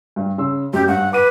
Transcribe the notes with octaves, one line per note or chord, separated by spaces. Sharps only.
G2 G3
C#3 C6 E6
F#2 G4
G2 F#5
B4 D6 D#7